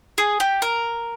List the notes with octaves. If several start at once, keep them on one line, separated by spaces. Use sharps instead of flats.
G#4
G4
A#4